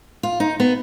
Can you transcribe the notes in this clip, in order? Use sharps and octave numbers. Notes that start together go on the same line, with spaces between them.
F4
D#4
B3